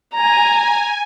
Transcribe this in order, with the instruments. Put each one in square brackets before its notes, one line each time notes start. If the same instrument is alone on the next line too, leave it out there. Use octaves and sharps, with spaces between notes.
[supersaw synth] G#5 [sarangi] A#5